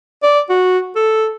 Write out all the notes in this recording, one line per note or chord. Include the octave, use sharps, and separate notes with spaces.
D5
F#4
A4